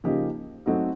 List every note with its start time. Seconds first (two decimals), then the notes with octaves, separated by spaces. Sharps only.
0.04 C#3 F3 A#3 D#4 G4
0.66 F#3 A3 C4 D#4 F#4